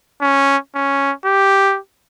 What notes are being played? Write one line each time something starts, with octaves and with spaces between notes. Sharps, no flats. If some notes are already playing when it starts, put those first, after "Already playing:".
C#4
C#4
G4